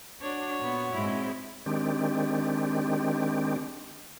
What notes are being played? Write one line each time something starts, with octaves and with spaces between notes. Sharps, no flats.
D4 F#4 C#5
A#2 B3
G#2 G#3 C4 E4
D#3 G#3 C4 D4 G4